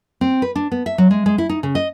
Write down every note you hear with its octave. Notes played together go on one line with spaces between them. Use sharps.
C4
B4
D4
B3
E5
F#3
G#3
G#3
E4
D#4
C#3
D#5